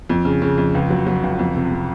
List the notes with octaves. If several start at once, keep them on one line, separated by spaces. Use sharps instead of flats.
F2
C#3
C#3
F2
C#2
F#3
F#3
C#2
F2
C3
C3